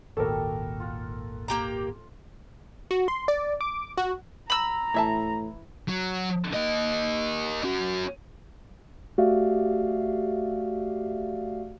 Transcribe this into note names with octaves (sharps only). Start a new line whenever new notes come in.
G#1 D#2 A#2 G3 A3 F#4 A4 A#4
F4 F#5
A#3 G4 A#5
F#4
C6
D5
D6
F#4
A#5 B5 E6
A2 E3 E5 A5
F#3
A#3 D#5
C#4 F#4
A3 F#4 G4 D5 E5 F5